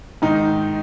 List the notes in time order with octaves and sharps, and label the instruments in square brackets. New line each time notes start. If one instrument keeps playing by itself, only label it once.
[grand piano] G#2 D#3 D#4